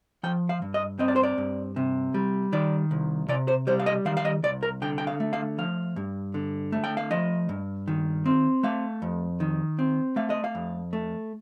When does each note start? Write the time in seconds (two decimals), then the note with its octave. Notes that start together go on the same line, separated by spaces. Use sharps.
0.23 F3 G5
0.49 F5
0.62 G2
0.74 D#5
0.99 C4 D#5
1.08 D5
1.16 C5
1.23 D5
1.38 G2
1.76 C3
2.14 G3
2.53 D#3 D5
2.91 C2
3.28 C3 D5
3.48 C5
3.67 G3 C5
3.80 F5
3.86 D#5
4.05 D#3 F5
4.17 F5
4.25 D#5
4.43 C2 D5
4.63 A#4
4.82 D3 G5
4.98 G5
5.07 F5
5.20 A3
5.33 F5
5.58 F3 F5
5.96 G2
6.34 D3
6.72 A3
6.84 G5
6.97 F5
7.11 F3 D#5
7.49 G2
7.87 D#3
8.26 C4
8.63 A3 F5
9.02 F2
9.40 D#3
9.79 C4
10.16 A3 F5
10.30 D#5
10.44 F5
10.55 F2
10.93 A3